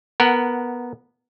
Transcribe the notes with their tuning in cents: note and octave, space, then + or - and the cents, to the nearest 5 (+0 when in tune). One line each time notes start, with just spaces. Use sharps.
B3 -10 A#4 -5 F#5 +10